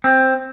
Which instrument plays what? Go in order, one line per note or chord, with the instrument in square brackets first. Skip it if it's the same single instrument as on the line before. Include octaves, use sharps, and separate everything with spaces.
[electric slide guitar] C4